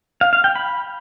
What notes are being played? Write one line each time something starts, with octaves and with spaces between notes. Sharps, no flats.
F5
F5
G5
B5